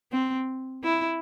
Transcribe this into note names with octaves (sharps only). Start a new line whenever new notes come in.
C4
E4